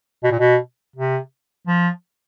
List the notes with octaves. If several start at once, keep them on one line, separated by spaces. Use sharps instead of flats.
B2
A#2
B2
C3
F3